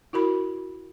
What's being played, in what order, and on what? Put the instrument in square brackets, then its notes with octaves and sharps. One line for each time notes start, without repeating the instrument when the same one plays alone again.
[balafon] E4 F#4 A#4 B5